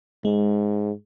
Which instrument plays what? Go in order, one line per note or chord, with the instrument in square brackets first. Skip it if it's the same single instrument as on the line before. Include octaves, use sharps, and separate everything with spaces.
[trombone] G#2 [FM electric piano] G#3